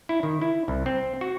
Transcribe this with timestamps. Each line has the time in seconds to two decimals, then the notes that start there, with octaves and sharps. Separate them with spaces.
0.09 E4
0.23 D#3
0.41 E4
0.68 C2
0.86 C4
1.21 F#4